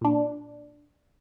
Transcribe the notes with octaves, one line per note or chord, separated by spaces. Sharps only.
A#2 D4